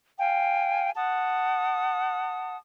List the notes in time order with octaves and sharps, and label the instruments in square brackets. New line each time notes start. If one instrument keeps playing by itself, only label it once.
[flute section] F5 G5 G#5
F#5 A5 D#6